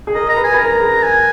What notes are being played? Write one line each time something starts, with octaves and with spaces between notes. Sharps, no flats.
G#4
A#4 D#5
A#5
B4
G#5
B4
A#4 A#5
G#4
G#5